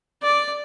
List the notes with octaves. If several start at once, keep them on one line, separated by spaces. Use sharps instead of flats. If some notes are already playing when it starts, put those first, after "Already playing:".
D5